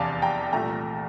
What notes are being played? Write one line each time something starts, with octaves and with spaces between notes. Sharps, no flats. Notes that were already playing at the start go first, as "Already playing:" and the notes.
Already playing: F1 E2 C3 D5 F5 A5
G5 A#5
C2 A#2 A3 G5 A#5